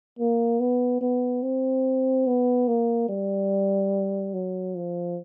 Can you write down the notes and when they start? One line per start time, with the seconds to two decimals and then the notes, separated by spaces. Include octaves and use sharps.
0.19 A#3
0.60 B3
1.01 B3
1.42 C4
2.27 B3
2.68 A#3
3.08 G3
4.33 F#3
4.75 F3